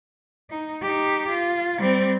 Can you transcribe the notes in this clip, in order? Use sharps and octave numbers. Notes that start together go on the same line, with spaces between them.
D#4
D#4 G4
F4
G3 C4